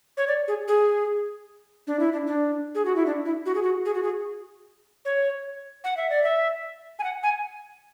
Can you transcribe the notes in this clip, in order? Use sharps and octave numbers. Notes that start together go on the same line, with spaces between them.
C#5
D5
G#4
G#4
D4
E4
D4
D4
G#4
F#4
E4
D4
E4
F#4
G#4
F#4
G#4
F#4
G#4
C#5
F#5
E5
D5
E5
G#5
F#5
G#5